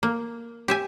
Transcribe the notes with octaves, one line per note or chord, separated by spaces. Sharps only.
A#3
G4 E5 G#5